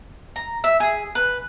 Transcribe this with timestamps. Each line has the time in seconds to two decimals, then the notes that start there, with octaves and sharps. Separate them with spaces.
0.36 A#5
0.64 E5
0.80 G#4
1.15 B4